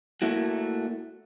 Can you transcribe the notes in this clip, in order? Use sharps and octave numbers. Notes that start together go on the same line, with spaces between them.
A3 A#3 E4 F#4